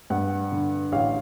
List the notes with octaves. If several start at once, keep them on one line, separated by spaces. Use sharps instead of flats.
G2 F#5
D3
A1 F5